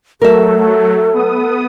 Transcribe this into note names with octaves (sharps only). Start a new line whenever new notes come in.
F#3 A3 A4 A#4 E5
B3 D#6